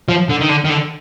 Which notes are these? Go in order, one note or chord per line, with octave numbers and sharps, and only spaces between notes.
F3
D3
D#3
D3
D#3
D3